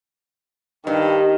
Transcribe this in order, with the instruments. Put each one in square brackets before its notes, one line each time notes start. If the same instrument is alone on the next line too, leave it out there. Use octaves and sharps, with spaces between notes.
[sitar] G2 [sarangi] D#3